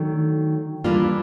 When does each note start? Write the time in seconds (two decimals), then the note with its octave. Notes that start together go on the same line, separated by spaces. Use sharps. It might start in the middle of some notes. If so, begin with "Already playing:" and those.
Already playing: D#3 F#3 A3 D4
0.84 E3 G3 A#3 D4 F4